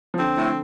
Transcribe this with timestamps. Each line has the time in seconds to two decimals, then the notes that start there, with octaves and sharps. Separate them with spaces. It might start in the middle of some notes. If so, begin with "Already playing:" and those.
0.14 F3
0.19 D3 C4
0.37 A2